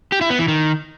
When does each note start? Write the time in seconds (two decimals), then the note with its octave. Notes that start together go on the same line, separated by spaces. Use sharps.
0.12 G4
0.21 E4
0.30 B3
0.39 E3
0.48 D#3